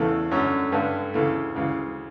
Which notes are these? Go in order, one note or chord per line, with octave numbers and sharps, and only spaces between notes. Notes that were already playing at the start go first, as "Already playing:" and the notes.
Already playing: E2 C#3 E3 A3
F#2 D3 C#4
G2 D3
D2 C#3 E3 A3
D2 C#3 E3